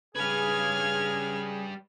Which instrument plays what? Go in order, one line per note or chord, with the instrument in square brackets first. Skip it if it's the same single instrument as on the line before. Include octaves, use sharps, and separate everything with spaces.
[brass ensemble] C#3 G#4 [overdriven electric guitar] G3 B4 [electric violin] F6 G#6